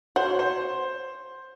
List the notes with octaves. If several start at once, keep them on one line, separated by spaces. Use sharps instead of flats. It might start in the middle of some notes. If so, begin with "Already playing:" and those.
F#4 C5
C#5
C5